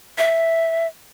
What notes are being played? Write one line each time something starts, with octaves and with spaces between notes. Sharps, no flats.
E5